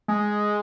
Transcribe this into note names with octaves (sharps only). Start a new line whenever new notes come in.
G#3